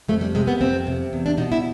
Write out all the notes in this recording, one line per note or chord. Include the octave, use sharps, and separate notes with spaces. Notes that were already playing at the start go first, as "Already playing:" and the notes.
F2 A3
G3
C3 G#3
B3
F2 C4
C3
E2
D4
B2 D#4
E4